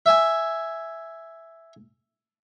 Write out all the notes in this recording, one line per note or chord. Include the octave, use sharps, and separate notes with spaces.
E5 G#5